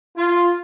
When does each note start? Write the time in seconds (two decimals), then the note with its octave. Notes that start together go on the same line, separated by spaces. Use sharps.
0.17 F4